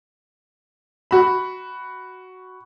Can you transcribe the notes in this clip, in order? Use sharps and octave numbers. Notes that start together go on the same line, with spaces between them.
F#4 B5